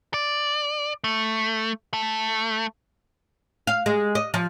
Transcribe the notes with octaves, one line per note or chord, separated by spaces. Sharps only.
D5
A3
A3
F5
G#3
D#5
F3